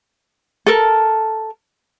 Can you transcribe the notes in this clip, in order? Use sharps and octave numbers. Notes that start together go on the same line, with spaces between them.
A4 A#4